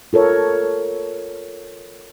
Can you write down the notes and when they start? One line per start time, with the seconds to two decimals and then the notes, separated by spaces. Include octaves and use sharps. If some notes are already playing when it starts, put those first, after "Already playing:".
0.13 F4 A4 A#4 C#5